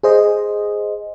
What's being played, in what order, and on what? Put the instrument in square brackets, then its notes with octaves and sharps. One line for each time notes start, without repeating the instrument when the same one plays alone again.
[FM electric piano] G#4 C5 D#5